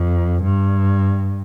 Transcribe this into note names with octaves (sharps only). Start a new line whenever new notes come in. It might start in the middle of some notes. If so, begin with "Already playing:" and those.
Already playing: F2
G2